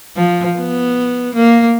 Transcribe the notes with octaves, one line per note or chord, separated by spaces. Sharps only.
F3
B3
A#3